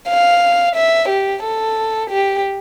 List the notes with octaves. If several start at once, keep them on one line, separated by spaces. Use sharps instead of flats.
F5
E5
G4
A4
G4